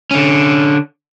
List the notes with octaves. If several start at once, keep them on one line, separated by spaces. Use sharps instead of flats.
D3 C#4